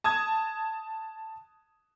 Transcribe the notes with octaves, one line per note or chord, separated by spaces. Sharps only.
A5 D#6 G#6